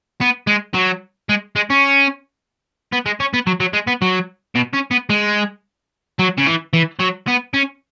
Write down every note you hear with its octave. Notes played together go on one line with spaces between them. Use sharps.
B3
G#3
F#3
G#3
G#3
C#4
B3
G#3
C#4
B3
F#3
F#3
G#3
B3
F#3
B2
C#4
B3
G#3
F#3
C#3
E3
E3
F#3
B3
C#4